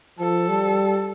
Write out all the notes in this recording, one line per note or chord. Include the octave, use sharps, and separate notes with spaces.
F3 A4
G3